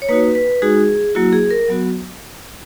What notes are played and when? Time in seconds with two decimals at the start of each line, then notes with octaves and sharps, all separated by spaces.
0.02 C#5
0.09 A#3 D#4 F#4 B4
0.35 B4
0.62 G#3 D#4 F#4 G#4
1.15 F#3 A#3 E4 F#4
1.32 G#4
1.51 A#4
1.68 F#3 B3 F#4